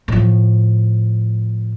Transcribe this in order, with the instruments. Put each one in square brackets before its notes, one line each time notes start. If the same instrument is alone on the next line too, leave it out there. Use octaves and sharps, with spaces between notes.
[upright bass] A2 F3